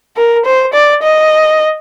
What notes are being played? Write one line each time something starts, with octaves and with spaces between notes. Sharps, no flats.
A#4
C5
D5
D#5